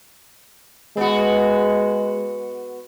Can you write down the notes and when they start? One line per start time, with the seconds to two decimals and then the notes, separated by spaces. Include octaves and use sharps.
0.97 G#3 B3 F#4